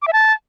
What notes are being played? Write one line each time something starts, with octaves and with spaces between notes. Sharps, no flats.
D6
E5
A5